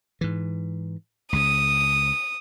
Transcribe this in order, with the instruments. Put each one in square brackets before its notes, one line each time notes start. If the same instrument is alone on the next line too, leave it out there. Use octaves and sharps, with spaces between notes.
[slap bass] G#2 E3
[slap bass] C#2 C#3 [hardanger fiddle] D#6